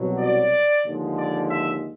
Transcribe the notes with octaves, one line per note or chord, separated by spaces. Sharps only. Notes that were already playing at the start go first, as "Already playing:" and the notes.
Already playing: C2 B2 F#3
D5
D#2 D3 F3 G#3
D5
E5